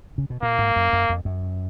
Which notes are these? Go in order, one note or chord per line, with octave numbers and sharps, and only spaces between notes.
C#3
B2
A#2 A#3
G#2
F#2
F#2
F2
F#2